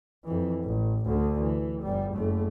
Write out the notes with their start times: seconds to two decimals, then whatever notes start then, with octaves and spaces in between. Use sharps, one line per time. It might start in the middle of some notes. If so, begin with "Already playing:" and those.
0.24 F2 E3
0.64 A1
1.06 D2 D3
1.40 E3
1.82 G1 G3
2.14 F#1 A3